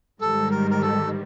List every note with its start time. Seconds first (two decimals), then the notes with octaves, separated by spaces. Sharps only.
0.21 G#2 D#3 G3 A4
0.51 A#4
0.71 A#4
0.82 A4